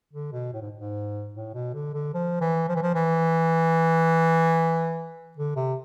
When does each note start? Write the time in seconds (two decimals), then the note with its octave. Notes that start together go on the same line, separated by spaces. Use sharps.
0.13 D3
0.33 B2
0.54 A2
0.62 G#2
0.78 G#2
1.34 A2
1.54 B2
1.74 D3
1.95 D3
2.14 F3
2.41 E3
2.69 F3
2.76 E3
2.83 F3
2.95 E3
5.37 D3
5.56 C3